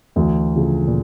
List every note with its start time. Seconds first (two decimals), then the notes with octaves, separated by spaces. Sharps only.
0.16 D2 E3
0.55 C#3 F3
0.88 A#2